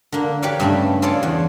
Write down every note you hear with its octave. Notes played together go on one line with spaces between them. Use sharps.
D3 A#3
G4 B4 C#5 D5 F5
G2 C#3 A3 G4 B5
F4 G#4 A4 C#5 D5
E2 F#5